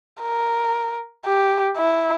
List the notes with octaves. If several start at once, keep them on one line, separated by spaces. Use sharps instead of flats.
A#4
G4
E4